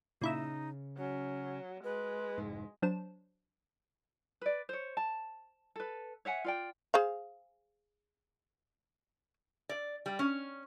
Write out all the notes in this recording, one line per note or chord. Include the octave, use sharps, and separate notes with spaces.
A#2 C#3 D#4 E4 E6
F#3 C#4
G#3 B4
F1 G#2
F#3 D4 C5 A5 E7
B4 D5
C5 C#5
A5
A4 B4
C#5 E5 F#5 G#5
F4 D5 G5
G#4 C5 F5
D5
G3
C#4